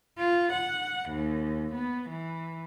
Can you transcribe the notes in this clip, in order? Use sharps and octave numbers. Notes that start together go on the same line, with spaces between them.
F4
F#5
D#2
B3
E3